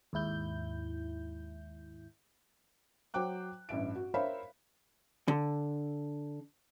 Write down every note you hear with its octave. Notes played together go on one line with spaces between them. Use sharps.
D#2 G#2 E4 G6
F#3 C5 G5 D6 F#6
A1 G2 E5 D7
F#4
A#4 C5 C#5 E5 F5 B5
D3